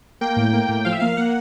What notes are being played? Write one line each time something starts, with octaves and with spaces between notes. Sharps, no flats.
A#3 G5
A2
A#3
A2
F3 F5
E5
A#3 F5
A#3 F#5